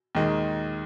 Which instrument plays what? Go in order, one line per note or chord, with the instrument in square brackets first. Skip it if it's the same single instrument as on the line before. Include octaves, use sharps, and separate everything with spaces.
[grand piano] D#2 D#3 G#3